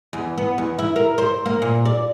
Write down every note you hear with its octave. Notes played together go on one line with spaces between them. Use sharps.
E2
B3
E2
E4
A#4
C5
A#3
A#2
D5